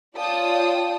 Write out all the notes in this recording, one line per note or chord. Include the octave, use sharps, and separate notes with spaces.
F4 C#5 D5 G5 A5 D#6